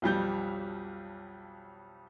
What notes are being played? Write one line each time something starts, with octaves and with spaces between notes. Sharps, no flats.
B1 F2 G3 G6